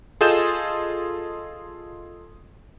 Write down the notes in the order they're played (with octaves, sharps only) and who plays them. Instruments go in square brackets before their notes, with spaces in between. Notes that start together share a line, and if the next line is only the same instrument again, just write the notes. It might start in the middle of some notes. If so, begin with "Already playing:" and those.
[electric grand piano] F4 G#4 A4 D#5 G6 E7